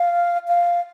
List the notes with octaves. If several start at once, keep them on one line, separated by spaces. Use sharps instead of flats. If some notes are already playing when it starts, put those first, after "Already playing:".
Already playing: F5
F5